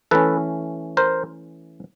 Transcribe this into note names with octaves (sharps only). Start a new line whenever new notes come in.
E3 A3 C#4 A4 B4
A#4 C5